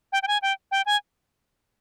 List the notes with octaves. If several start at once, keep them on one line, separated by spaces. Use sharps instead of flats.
G5
G5
G#5
G5
G5
G#5